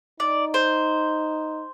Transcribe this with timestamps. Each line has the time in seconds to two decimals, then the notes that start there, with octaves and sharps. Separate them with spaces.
0.20 D#4 D5
0.54 C5